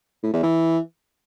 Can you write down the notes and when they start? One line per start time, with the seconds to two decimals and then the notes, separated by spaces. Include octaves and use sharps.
0.23 A2
0.33 E2
0.43 E3